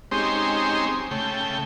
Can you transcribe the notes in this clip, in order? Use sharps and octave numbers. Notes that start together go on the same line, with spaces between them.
G#3 C4 C#4 D#4 G4 C5
C#3 A3 G5